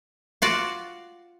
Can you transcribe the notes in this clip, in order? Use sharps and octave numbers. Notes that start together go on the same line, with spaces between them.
F4 F#4 D5